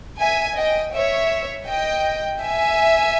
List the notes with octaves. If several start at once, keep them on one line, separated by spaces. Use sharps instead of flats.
E5 G#5
D#5 G5
C#5 E5
D#5 G5
E5 G#5